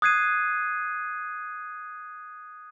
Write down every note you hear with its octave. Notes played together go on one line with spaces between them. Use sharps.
D#6 F#6 G#6 C7 D#7